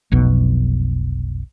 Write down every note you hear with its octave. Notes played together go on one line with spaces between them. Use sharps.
F1 B1 B2